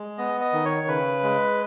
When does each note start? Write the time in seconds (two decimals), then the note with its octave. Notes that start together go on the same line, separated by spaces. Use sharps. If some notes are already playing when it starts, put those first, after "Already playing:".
Already playing: G#3
0.18 B3 D#5
0.41 D#5
0.53 D#3
0.65 C#5
0.87 C#3 B4
1.23 G#3